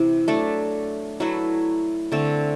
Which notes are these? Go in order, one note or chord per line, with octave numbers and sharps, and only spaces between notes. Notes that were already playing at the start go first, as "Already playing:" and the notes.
Already playing: C3 E3 E4
F#3 A3 D4 A4
F#3 A3 E4 B4
D3 A3 C4